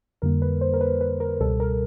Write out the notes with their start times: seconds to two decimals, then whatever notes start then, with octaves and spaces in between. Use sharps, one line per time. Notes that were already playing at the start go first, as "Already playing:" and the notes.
0.22 F2 D3 G3 A#3 A#4
0.42 B4
0.61 C5
0.74 A#4
0.81 B4
1.01 B4
1.20 A#4
1.40 C#2 B2 G3 A4
1.60 A#4